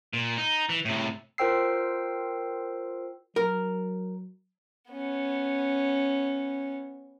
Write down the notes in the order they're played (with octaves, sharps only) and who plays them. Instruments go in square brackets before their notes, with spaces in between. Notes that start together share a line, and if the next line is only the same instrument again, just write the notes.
[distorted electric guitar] A#2
D#4
E3
A2 C3
[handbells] F4 A#4 C5 G5 E6 C7
[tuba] F#3 [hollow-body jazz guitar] A#4
[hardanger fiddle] B3 C#4